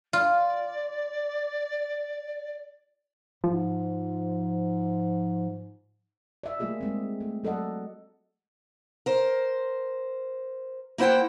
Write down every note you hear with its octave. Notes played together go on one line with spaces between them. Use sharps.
F4 D5
G#2 F3
D5 E5
G3 A3 A#3 F4 G#4 D#5
G#3 C4
A3
F#3 A4 D5 D#5 F#5
A#4 C5
A#3 E4 C5 F#5 G5